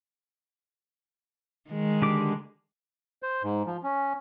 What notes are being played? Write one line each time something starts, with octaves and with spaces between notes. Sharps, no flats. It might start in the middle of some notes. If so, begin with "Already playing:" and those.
D#3 G#3
D3 G4 D6
C5
G#2
F3
C#4